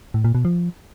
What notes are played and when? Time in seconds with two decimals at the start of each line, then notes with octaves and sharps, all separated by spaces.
0.14 A2
0.24 A#2
0.35 B2
0.45 F3